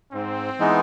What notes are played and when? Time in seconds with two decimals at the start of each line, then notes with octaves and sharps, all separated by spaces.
0.12 G#2 C4
0.59 E3 G#3 B3 D#4